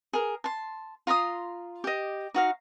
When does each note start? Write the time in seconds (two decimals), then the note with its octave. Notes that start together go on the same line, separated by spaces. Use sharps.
0.13 G#4 A#4
0.44 A5 C6
1.07 F4 A#5 C6 D#6
1.84 G4 D#5
2.34 D#4 F#4 F5